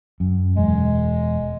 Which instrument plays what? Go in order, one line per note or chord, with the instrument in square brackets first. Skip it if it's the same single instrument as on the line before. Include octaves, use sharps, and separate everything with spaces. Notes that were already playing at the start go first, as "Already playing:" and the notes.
[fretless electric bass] F#2
[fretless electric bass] E1 [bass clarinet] G#3